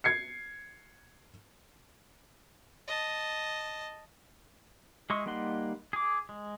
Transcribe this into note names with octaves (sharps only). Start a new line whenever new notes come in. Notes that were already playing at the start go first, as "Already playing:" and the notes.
G#6 C7 C#7
D#5 A5
G#3 E4 D#5 C6 C#6
G3 A#3 D#4 F#5 C6
G#4 D6
G#3